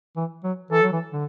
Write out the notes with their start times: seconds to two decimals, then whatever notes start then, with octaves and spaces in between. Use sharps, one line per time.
0.16 E3
0.43 F#3
0.71 E3 A4
0.82 F#3
0.92 E3
1.12 D3